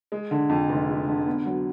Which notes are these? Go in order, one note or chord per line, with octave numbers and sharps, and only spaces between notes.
G#3
D3
F2
F1
G#3
D3
B3
F#3